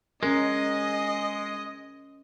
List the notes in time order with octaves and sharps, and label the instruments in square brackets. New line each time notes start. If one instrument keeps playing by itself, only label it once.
[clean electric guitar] G#3 [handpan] C#4 A#4 [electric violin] D#5